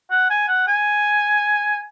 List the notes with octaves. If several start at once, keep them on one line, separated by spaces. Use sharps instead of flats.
F#5
G#5
F#5
G#5